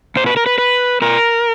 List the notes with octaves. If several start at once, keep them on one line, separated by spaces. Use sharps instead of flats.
A#2 C5
B4
A#4
B4
B4
B2 A#4